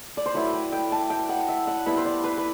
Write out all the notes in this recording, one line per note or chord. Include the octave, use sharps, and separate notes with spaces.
D5
C5
F#3 A3 E4 B4
G5
G5
A5
G5
F#5
E5
F#5
G3 B3 E4 B5
C5
D5
B4
B4